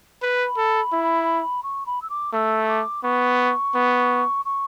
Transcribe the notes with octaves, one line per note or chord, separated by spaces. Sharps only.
B4 B5
A4
E4
C#6
B5
E6
D6
A3 E6
D6
B3 C#6
B3
C#6